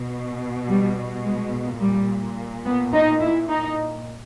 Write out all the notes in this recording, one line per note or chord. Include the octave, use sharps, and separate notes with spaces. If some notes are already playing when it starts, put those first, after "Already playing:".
Already playing: B2
G3
G#3
A#2 G3
B3
D#4
E4
D#4